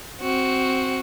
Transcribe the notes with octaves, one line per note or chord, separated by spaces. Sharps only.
C4 F#4